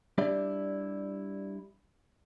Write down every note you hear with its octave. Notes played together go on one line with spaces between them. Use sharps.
G3 D4 E4 G4 D5 E5